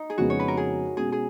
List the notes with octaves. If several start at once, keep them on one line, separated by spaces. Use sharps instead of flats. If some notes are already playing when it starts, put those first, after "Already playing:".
Already playing: D#4
G#4
F2 C#3 G#3 B3 F#4
C#5
B4
A#4
G#4
B2 G#3 C#4 G#4
G#4